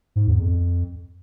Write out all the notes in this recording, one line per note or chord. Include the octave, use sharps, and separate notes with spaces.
G#2
E2
F2